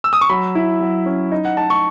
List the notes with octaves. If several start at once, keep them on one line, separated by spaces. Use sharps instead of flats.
E6
D#6
C#6
F#3 B5
E4
F#3
C#4
D#4
F#5
D#4 A5
C#6